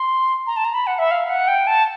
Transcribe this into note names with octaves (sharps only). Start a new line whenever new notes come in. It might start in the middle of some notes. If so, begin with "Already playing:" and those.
Already playing: C6
A#5
A5
A#5
B5
F#5
E5
F5
F#5
G5
A5